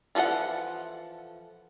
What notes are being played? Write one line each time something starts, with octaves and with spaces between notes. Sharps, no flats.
E3 F3 A#3 A4 F#5